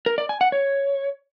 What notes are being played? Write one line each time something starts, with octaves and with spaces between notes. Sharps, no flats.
A#4
D5
G#5
F#5
C#5